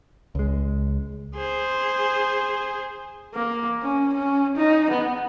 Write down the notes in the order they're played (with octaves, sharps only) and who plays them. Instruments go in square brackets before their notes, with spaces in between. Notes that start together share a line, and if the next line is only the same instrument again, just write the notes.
[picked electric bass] C#2 G#3
[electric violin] G#4 C5
[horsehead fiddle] A#3
C#4
C#4
D#4
B3